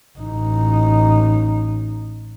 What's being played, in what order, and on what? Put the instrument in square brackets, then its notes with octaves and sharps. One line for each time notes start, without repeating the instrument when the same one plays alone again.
[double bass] A1 D#4